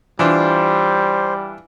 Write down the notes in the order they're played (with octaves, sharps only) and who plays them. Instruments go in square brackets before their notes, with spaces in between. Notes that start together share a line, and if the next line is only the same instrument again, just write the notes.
[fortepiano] E3 D4 F4 [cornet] G3 [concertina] C5